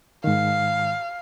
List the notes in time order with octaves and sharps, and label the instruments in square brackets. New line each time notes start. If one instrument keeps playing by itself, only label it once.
[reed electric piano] G#2 D#3 [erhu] F5